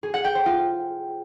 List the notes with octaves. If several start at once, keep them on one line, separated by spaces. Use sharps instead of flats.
G#4
F#5
G5
C5
F4